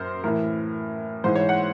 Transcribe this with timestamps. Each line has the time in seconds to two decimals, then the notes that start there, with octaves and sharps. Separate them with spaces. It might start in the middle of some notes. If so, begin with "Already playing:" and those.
Already playing: F#2 A#4 C5
0.24 A2 E3 A#4
1.24 G#2 E3 C5
1.36 C#5
1.49 F#5